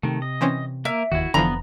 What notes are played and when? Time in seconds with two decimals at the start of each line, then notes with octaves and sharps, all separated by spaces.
0.03 C3 D#3 A3
0.22 D#5
0.41 E3 C4 C#4
0.85 A#3 A#4 E5
1.12 F1 D#2 D#3 E4 F#4
1.34 F1 D3 E3 F3 B3 A#5 B5